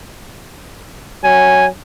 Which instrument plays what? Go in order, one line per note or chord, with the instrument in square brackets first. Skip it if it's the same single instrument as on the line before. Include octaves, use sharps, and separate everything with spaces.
[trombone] F#3 [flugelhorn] G#5